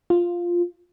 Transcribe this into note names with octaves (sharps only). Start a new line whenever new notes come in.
F4